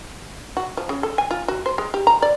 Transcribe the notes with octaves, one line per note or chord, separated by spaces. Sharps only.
F#4
F3
C#3
A4
G#5
F4
F#4
C5
G#3
G4
A#5
D5